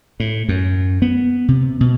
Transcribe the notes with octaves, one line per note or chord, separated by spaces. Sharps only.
A2
F#2
B3
C3
B2